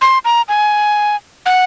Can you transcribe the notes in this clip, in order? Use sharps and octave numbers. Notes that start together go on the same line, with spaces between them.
C6
A#5
G#5
F#5